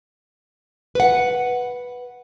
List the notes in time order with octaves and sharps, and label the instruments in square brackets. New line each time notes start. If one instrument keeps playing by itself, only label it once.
[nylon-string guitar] B4 F#5